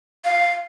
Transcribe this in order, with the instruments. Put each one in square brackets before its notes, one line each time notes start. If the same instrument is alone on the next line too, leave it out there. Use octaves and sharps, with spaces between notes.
[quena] F5